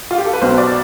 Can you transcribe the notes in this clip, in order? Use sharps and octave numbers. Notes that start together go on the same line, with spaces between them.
F4
G4
A4
B4
B1 B2 C5
D5